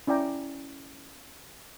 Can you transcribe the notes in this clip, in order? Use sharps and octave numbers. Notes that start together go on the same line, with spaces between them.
C#4 E4 D5 G5 A#5